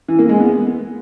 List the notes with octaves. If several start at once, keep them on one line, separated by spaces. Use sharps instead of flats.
E3
A#3
G#3
B3